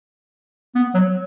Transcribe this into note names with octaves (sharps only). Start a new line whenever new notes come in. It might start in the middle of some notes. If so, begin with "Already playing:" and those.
B3
F#3